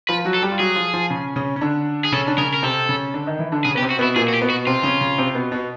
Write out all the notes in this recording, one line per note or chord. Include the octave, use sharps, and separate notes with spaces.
F3 F4 B4
F#3 F#4
A4
G3 G4
F4
F#3 F#4 G#4
F3 F4
F3 F4
C#3 C#4
C#3 C#4
C#4
D3 D4
G#4
C#3 C#4 A4
D4
C#3 C#4 A#4
A#4
C3 C4 A4
C#3 C#4
D3 D4
D#3 D#4
E3 E4
D3 D4
C#3 C#4 G#4
B3 G4
C3 C4
F#4
B2 B3 E4
A#2 A#3 G#4
F#4
G4
B2 B3
F#4
C3 C4 F4
C#3 C#4
C#3 C#4
C3 C4
B2 B3
B2 B3